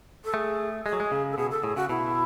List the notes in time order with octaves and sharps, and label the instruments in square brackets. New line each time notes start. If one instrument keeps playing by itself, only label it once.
[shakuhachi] A4
[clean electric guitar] A3 [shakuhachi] G#4
[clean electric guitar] G#3 [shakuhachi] G#4
[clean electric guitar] F#3
G#3
C#3
[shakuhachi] A4
[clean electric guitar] B2 [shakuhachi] G#4
[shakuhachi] A4
[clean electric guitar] A2 [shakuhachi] G#4
[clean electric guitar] C#3 [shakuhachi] F#4
[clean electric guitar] B2 [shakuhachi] E4